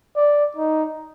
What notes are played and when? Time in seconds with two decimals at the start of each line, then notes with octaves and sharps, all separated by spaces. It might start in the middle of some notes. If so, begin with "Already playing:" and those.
0.16 D5
0.56 D#4